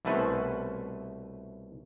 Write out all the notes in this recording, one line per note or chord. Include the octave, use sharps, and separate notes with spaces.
C2 B2 A3 C#4 B4 C5